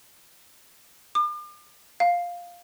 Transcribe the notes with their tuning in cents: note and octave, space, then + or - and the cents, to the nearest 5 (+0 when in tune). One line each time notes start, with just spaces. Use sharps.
D6 +40
F5 +5